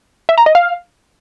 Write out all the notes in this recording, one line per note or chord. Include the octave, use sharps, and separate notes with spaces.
E5
A#5
D#5
F5